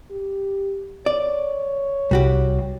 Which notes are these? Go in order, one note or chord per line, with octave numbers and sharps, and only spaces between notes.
G4
C#5 D5
C2 G3 F#4 G4